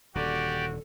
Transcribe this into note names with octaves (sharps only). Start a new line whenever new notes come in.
D#1 D3 F#4 G4 A4 D5